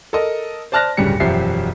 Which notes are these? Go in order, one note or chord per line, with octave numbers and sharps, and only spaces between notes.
A4 A#4 D#5
C5 D5 A5 F6 F#6 A#6
D1 G2 C#3 G3 C#7
E1 F#2 F3 G4 E5 C7